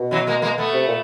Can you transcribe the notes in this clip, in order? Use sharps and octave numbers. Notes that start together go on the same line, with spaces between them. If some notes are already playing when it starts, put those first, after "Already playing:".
Already playing: B2
E3 F#3
G#3 A#3
G#3 A#3
A3 B3
C3
A#2